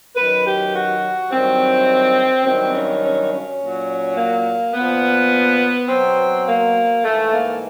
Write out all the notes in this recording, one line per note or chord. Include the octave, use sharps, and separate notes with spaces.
F#2 D#3 F#3 B4
G4
F#4
G2 D#3 F#3 C4
G2 D#3 F#3 C4
C#4
C#4
C#4
A#2 F#3
A#3
A#2 F3 B3
B2 F#3 C4
A#3
G#2 E3 A3
A#3